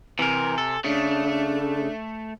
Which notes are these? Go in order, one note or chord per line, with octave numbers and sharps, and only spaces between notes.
C3 E3 A#4 G#5
A4
C#3 A3 D4